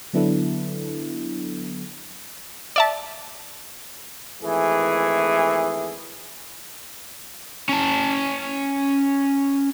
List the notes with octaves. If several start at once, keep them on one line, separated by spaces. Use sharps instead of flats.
D3 F#3 B3 D4 E4 A4
D5 E5 A5
G#1 E3 A3 G#4
C#4 A5